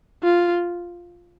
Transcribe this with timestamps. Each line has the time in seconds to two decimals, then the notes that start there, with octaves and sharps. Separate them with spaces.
0.23 F4